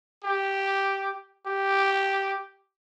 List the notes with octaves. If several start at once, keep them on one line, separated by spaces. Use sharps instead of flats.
G4
G4